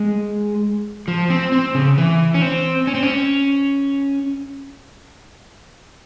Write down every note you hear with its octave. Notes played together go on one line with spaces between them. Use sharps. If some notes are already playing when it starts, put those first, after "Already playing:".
Already playing: G#3
F3
C4
C4
C#3
E3
C#4
C4
C#4
C4
C#4